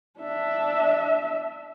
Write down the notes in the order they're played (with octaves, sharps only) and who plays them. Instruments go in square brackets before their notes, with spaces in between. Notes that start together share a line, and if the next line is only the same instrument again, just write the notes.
[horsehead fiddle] D4 E5